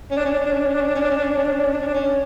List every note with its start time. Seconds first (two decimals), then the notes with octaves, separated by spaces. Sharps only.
0.11 C#4
0.17 D4
0.25 C#4
0.32 D4
0.39 C#4
0.46 D4
0.53 C#4
0.60 D4
0.66 C#4
0.74 D4
0.81 C#4
0.88 D4
0.95 C#4
1.02 D4
1.10 C#4
1.17 D4
1.24 C#4
1.31 D4
1.38 C#4
1.45 D4
1.52 C#4
1.60 D4
1.66 C#4
1.73 D4
1.81 C#4
1.87 D4
1.95 C#4